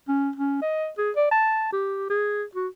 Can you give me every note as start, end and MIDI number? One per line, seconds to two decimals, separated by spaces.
0.08 0.30 61
0.36 0.61 61
0.62 0.89 75
0.98 1.11 68
1.16 1.30 74
1.31 1.71 81
1.72 2.07 67
2.10 2.43 68
2.55 2.67 66